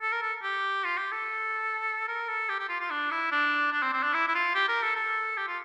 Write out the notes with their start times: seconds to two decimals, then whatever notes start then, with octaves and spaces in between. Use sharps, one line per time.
0.02 A4
0.12 A#4
0.22 A4
0.43 G4
0.84 F4
0.98 G4
1.12 A4
2.08 A#4
2.28 A4
2.49 G4
2.59 G4
2.69 F4
2.80 F4
2.90 D4
3.11 E4
3.32 D4
3.72 D4
3.83 C4
3.93 C4
4.03 D4
4.14 E4
4.28 E4
4.35 F4
4.55 G4
4.68 A#4
4.83 A4
4.96 A4
5.37 G4
5.48 F4